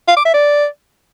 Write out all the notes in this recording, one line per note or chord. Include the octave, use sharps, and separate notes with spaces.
F5
D6
E5
D5